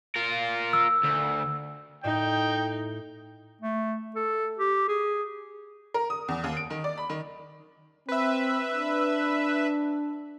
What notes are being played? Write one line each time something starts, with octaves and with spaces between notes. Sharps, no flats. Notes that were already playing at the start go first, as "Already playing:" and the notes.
F4 A#4
E6
D2
A2 D#4 G5
A3
A4
G4
G#4
A#4
D#6
E2
D#2
D7
D#3
D5
B5
D#3
C4 B4 E5
D4